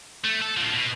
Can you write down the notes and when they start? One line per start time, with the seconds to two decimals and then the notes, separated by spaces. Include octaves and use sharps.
0.24 A3
0.41 A4
0.57 A2 F3
0.72 B2